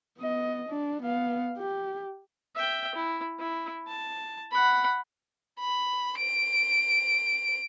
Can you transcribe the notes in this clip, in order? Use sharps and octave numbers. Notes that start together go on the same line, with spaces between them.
B3 D#5
D4
B3 F5
G4
E5 G5
E4
E4
A5
F#5 B5
B5
D7